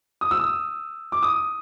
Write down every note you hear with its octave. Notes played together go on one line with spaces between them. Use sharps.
D#6
E6
D#6
D6
D#6